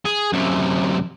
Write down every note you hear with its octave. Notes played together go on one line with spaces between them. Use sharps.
G#4
F#2 C3